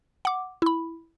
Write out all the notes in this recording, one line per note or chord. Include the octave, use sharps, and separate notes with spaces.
F#5 D6
E4 B5